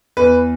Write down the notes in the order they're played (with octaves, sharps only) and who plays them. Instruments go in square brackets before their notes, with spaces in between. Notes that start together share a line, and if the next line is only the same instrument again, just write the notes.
[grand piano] E2 B4